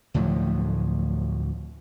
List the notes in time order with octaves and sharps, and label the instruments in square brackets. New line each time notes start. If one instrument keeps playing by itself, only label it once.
[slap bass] D2 A2 F3 F#3